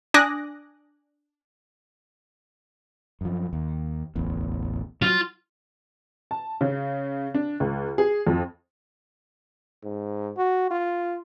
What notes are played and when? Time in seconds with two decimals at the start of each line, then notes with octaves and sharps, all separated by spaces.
0.14 D4 G#5 D6 D#6 F#6 A#6
3.21 F#2 F3
3.53 D#2
4.16 D1 A1 E2
5.02 F#3 F4
6.31 A5
6.61 C#3
7.34 D4
7.60 C#2
7.98 G#4
8.27 F2
9.83 G#2
10.37 F#4
10.71 F4